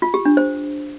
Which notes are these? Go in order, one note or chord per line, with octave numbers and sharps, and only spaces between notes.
F4
G4
D4
C5